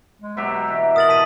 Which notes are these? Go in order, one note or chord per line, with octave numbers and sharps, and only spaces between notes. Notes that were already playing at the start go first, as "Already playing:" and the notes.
G#3
B2 F#3 G4 E5
E3
A#4 D#6 A6 F#7
A5 B6 D#7